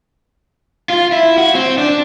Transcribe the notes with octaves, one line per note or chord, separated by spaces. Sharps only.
F4
E4
F#4
C4
D4